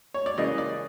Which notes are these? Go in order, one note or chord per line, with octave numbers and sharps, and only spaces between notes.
C#5
D5
C#3 E3 G3 A#3 D#5
D5